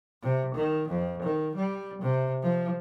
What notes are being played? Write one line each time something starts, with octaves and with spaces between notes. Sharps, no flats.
C3
D#3
F2
D#3
G3
C3
F3